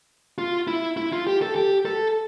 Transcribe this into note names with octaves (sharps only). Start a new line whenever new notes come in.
F4
E4
E4
F4
G4
A4
G4
A4